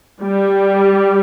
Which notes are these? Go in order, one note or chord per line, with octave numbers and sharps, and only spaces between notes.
G3